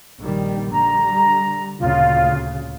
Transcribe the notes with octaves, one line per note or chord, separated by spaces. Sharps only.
A#1 D#3 G3
D3 G3 A#5
D2 A#2 C#3 F4